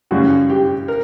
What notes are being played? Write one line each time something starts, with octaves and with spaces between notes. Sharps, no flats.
F#2 C#3 G3 C#4 F#4
G4
A#4